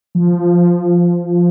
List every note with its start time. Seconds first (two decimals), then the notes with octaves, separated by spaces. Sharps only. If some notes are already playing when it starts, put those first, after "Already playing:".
0.15 F3